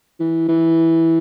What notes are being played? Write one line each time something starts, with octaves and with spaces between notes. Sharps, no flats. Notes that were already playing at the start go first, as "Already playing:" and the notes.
E3
E3